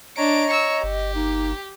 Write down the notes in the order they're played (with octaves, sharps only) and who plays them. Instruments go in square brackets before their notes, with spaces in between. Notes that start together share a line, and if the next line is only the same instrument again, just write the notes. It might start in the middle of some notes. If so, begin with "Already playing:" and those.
[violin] D4 D7 [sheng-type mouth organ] C#5 A#5 [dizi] D#5
[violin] C#6 E6
[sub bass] G1 [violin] G4
[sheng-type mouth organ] A#3 [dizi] D#4